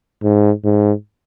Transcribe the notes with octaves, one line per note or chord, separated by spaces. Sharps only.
G#2
G#2